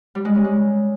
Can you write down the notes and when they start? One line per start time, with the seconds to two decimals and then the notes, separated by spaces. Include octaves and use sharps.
0.15 G3
0.25 G#3
0.35 C#4
0.44 G#3